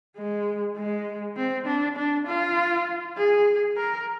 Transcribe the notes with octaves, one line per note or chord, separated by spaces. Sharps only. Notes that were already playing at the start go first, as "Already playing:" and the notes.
G#3
G#3
C4
D4
D4
F4
G#4
A#4